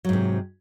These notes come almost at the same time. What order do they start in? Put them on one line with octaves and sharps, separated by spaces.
F#3 G#2 C3